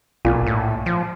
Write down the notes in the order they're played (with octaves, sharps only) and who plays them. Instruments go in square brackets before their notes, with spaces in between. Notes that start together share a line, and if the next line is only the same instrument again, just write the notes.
[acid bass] B1 [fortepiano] A#2
[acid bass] A2
F3